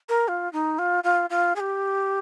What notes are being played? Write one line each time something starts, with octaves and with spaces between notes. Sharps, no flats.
A#4
F4
D#4
F4
F4
F4
G#4
G4